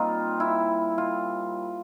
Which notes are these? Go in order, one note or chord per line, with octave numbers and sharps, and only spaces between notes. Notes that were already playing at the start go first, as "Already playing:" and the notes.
Already playing: A#2 G3 C4 D#4 F4
E4
F4